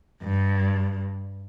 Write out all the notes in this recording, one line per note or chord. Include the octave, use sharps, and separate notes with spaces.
G2